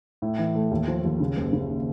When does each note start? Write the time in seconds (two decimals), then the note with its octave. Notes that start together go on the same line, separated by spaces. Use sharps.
0.22 A2
0.38 E3
0.55 A3
0.71 D#2
0.88 F3
1.04 D#2
1.20 C#3
1.36 F#1
1.53 C#3